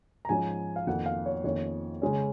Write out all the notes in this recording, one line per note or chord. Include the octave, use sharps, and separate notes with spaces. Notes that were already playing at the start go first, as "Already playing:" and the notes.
A#5
G#2 F3 G#3 C#4 G#5
F5
F2 D#3 A#3 F#5
F5
C#5
F2 D#3 A#3 C#4 C#5
C#3 G#3 C#4